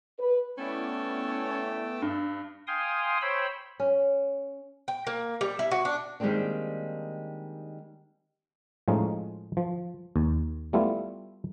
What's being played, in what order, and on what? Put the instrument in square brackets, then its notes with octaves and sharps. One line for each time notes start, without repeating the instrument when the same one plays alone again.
[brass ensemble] B4
[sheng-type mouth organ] A3 G5 A5 [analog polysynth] B3 E4 D5 [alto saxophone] C#4
[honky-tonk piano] G2
[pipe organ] F5 G5 G#5 C6 D#6
C5 C#5 G5 B5 E6
[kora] C#4
[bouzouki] G5
A#3
G3
E4
F#4
D4
[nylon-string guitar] D#3 G3 G#3 A#3 C4 D4
[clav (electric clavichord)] A2 F3 G#3 C#4 D#4
F3
D#2
G3 A3 B3 E4 F4